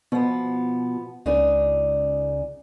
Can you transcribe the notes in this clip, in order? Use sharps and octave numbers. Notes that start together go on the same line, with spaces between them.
B2 F3 B3
C#2 C#3 D4 D#4